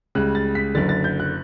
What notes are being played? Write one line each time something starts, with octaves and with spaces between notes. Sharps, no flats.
C#2 C#3 G3 F#6
A6
B6
F#1 F#2 D3 A6
A6
G6
F#6